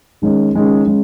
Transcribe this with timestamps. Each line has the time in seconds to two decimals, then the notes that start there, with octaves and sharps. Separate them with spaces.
0.22 D#3 G#3 C#4
0.54 D#3 G#3 C#4
0.86 G#3 C#4